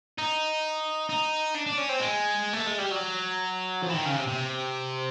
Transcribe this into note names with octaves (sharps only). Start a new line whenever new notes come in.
D#4
D#4
D4
D4
C#4
C4
G#3
A3
G#3
G3
F#3
F3
E3
D#3
C#3
C3
C3